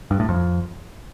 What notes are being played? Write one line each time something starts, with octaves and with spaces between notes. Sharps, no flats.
G2
A2
F2